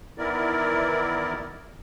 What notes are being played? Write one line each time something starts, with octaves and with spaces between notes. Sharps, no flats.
D#3 E3 B3 E4 A#4 D5